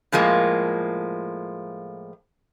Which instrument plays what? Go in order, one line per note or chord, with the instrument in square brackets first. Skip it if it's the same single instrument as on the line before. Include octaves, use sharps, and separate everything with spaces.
[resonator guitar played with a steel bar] A2 F3 G#3 A#3